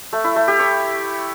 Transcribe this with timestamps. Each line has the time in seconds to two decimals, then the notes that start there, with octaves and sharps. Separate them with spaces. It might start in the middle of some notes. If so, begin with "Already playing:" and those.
0.13 A3
0.24 E4
0.36 A3
0.48 G4
0.59 C#5